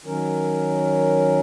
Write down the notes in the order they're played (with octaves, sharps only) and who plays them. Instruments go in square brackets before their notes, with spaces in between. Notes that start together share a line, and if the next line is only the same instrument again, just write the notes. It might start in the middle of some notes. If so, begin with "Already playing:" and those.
[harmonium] D#3 F#3 C#4 A#4